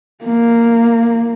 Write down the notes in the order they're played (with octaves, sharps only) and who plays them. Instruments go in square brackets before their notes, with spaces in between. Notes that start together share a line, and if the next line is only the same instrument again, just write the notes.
[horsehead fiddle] A#3